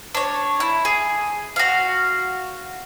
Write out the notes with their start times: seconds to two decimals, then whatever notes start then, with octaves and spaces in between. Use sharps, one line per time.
0.15 D4 C#5
0.60 E4
0.85 G#4
1.56 F#4 F5